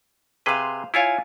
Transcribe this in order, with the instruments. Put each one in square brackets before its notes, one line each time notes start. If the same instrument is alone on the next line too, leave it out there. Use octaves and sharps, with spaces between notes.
[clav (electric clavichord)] C3 G#4 B4 [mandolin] C5 F5
[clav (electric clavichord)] E4 F4 C#5 [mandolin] F5 G#5 F6